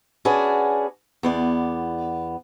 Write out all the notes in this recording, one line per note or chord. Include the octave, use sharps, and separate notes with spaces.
C#4 D4 F#4 G#4 B4 D5
E2 B3 D5